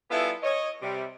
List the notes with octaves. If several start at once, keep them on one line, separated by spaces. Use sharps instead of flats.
G3 B3 E4 F4 G#4 A4
C#5 D#5
C3 G3